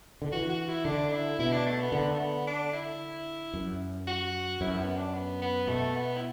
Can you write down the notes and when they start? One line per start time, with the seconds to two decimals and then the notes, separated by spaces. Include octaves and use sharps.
0.22 D3
0.32 E3 F#4
0.49 F#4
0.68 E4
0.85 D3 D4
1.08 D4
1.12 E4
1.39 B2 E4
1.53 D4
1.66 A3
1.80 B3
1.92 D3 B3
2.10 A3
2.19 B3
2.47 D4
2.73 E4
3.54 F#2
4.07 F#4
4.61 F#2 E4
4.79 B3
4.97 D4
5.14 B3
5.42 B3
5.68 B2 A3
5.95 B3
6.17 E4